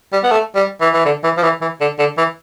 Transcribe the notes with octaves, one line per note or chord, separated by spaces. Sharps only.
G3
B3
A3
G3
E3
E3
D3
E3
F3
E3
E3
D3
D3
E3